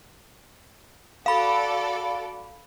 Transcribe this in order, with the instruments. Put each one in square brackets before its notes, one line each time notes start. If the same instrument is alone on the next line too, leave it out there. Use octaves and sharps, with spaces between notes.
[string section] F#4 A4 D5 [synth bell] F5 B5